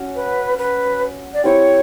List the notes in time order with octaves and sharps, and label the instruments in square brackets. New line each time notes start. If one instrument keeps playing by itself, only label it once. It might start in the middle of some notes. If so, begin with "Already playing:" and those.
Already playing: [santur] C#4 F#4
[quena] B4
B4
D5
[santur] C4 E4 G4 [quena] C#5